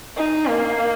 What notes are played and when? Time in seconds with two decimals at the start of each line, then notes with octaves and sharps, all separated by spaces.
0.17 D#4
0.48 A#3